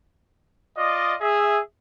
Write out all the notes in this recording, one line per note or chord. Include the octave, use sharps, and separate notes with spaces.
F4 D5 D#5
G#4 E5